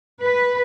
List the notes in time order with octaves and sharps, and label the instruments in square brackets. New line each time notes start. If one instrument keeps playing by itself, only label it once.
[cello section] B4